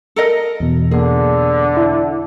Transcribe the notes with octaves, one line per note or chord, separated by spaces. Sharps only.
A4 A#4 D#5
E2 B2
D3 A#3 G#4
E4